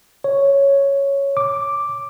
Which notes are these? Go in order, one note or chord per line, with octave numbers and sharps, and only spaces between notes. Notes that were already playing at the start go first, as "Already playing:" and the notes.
C#5
D6